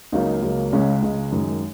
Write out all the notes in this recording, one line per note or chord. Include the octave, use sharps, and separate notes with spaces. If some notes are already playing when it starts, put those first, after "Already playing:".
C#2 C#3 F#3 A#3 D#4
C#2 C#3 F#3 A#3
C#2 C#3 G#3 C#4
C#2 C#3 G#3
F#2 D#3 G#3